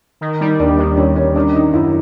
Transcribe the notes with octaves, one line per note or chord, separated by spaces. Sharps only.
D#3
G3 D#4
D#2 D4
D#3 D4
D#2 C#4
D#2 C#4
D#3 D4
D#3 D#4
F#2 E4